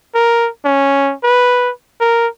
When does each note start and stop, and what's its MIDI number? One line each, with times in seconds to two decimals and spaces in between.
0.15 0.49 70
0.65 1.14 61
1.23 1.71 71
2.00 2.27 70